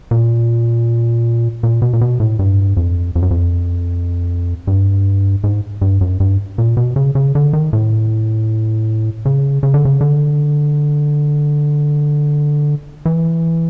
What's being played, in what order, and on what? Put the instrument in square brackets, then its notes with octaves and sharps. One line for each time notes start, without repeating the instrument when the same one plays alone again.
[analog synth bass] A#2
A#2
B2
A#2
B2
A2
G2
F2
F2
F#2
F2
G2
G#2
G2
F#2
G2
A#2
B2
C#3
C#3
D3
D#3
A2
C#3
C#3
D3
C#3
D3
E3